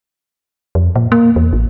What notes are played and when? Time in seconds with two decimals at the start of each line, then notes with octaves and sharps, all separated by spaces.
0.75 F2
0.96 A#2
1.12 A#3
1.36 E2
1.53 A1